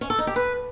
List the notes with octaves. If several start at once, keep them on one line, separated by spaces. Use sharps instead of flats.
C#4
A4
D#4
G4
B4